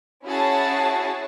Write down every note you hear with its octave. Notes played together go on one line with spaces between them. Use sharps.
C#4 E4 F#4 G#4 A5